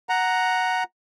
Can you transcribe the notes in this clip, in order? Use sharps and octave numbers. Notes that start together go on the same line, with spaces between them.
F#5 A#5